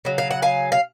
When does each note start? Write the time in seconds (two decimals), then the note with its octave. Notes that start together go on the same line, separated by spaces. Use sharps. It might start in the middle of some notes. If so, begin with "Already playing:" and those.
0.05 C#3 F#3
0.18 F5
0.31 F#5
0.42 F5 G#5
0.72 F5